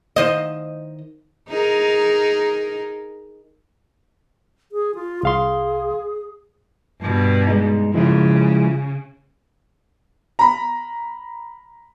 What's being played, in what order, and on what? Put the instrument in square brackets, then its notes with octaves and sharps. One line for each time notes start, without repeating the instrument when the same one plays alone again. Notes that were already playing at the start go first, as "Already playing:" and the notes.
[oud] D#3 C5 D#5
[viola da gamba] D#4 G#4 A#4
[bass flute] G#4
F4
[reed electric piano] C2 F5 C6 [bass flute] G#4
[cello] G2 B2
[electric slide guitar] G#3 D#4
[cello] C#3 [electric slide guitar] F3 G#3 E4
[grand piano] A#5 B5